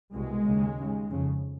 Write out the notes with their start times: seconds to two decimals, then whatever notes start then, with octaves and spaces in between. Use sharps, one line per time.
0.13 C2 B2 G#3
0.46 D#2 C#3
0.78 D#2 C#3
1.11 F2 C#3